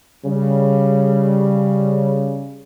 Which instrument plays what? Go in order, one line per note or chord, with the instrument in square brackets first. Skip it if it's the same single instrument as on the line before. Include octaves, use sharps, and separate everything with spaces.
[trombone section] C#3 G3